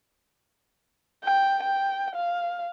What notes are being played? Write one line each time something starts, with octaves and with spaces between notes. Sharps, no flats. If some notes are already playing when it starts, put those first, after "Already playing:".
G5
G5
F5